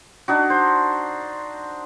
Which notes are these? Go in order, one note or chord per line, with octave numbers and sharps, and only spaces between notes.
D4 D#4 F#4
C5